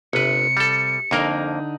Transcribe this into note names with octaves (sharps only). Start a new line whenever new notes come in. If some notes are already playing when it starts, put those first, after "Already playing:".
G1 C3 B4 C#7
G3 A4
F2 D3 A#3 D#4 A#4